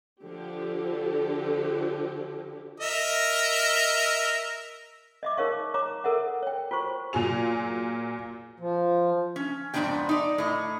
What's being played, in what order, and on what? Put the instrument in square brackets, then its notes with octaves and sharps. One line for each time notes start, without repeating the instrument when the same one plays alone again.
[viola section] D3 F3 G4
[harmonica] A#4 D#5 E5
[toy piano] D#5 E5 D6
D#4 A#4 C#5 F5 C#6
C#5 A#5 D6
A4 A#4 E5 F#5
C#5 G5
F4 F#4 C5 C#6
[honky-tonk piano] A#2 F#3 F4 G#4 F7
[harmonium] F3
[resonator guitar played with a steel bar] C#4
F2 G#2 F3 B3 D4 G5
D#4 D5
A2 D#5